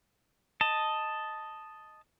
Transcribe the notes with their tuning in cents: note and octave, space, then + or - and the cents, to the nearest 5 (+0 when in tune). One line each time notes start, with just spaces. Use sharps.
D#5 +0 A5 +0